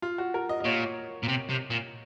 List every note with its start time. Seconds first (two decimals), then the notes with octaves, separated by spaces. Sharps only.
0.02 F4
0.18 F#4
0.34 A#4
0.49 D#5
0.60 D#5
0.65 A#2 C#5
1.23 A#2
1.28 C3
1.50 C3
1.70 A#2